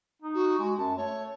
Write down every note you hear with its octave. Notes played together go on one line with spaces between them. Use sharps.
D#4
F#4
G#3 F#4
F#2 A5
A3 C#5